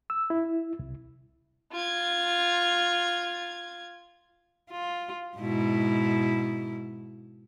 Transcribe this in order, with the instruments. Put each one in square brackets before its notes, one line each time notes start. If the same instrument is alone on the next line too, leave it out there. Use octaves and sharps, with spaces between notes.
[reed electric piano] E6
E4
C2
[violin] F4 G#6
[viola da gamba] F4
G#2 B2 E4